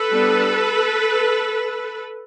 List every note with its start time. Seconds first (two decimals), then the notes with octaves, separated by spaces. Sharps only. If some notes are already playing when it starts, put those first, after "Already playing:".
Already playing: A4 B4
0.11 G3 B3 D4